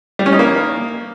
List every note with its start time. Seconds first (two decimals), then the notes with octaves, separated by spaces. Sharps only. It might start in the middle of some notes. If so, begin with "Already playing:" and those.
0.19 G3
0.26 C#4
0.33 D#4
0.39 A#3